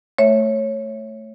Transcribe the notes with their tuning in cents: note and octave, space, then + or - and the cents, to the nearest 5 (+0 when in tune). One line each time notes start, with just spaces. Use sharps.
A3 +0 C#5 -10 E5 +0